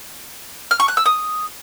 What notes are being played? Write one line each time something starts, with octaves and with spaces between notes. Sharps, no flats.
F6
C#6
F#6
E6
D#6